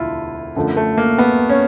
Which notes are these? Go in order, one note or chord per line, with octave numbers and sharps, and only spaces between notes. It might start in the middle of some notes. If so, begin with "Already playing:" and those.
Already playing: E1 D2 E4 F4
F#2 D3 F3 A3
A3
A#3
B3
C#4